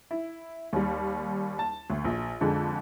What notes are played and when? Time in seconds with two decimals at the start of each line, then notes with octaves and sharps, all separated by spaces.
0.11 E4
0.73 D#2 G3
1.59 A5
1.90 D2
2.05 A#1
2.41 F2 D3 G#3